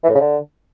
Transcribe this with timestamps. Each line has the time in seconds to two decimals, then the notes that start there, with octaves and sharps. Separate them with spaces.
0.04 E3
0.09 A2
0.15 C#3
0.20 D3